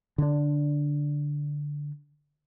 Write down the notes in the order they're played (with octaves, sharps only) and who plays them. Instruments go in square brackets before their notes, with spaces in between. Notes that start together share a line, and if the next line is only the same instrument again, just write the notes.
[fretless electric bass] D3 D4